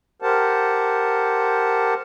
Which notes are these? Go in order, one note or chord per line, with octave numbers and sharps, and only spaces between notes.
G4 A#4 C5 F#5 A5